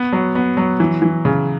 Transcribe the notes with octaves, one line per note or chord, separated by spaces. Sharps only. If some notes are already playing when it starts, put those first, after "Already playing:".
Already playing: B3
F#3
B3
F#3
E3
E3
C#3